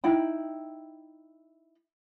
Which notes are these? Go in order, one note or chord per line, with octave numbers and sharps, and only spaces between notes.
D#4 E4 G5 B5